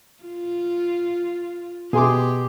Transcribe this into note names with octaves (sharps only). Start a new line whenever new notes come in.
F4
B2 G4 G#4 C6 D6